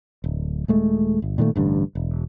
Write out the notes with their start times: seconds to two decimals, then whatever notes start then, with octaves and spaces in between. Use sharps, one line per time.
0.24 D1
0.68 D#1 G#3 A3
1.22 G1
1.38 A#2 D#3 G#3 A3
1.56 A1 G2 D3
1.95 E1